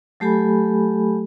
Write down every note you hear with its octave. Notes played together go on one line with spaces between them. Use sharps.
F#3 A3 G4 A4 G#5 B5